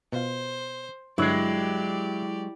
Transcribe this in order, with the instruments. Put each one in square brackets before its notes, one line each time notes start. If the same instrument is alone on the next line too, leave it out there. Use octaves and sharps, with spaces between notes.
[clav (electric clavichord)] B2 F4 [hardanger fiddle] C5
[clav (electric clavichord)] G2 D3 C#5 [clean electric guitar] F#3 G#3 [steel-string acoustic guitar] E4 [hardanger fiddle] G4 D5